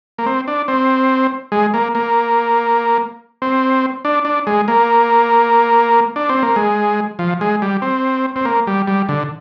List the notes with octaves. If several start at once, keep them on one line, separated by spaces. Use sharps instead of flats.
A#3
C4
D4
C4
G#3
A#3
A#3
C4
D4
D4
G#3
A#3
D4
C4
A#3
G#3
F3
G#3
G3
C4
C4
A#3
G3
G3
D3